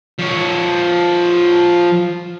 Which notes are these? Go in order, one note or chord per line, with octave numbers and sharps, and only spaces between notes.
F3 C#5